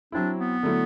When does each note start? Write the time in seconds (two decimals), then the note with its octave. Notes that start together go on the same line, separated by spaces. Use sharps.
0.12 F#3 C4 D4 E4
0.38 B3
0.63 D3 F#3 A3 E4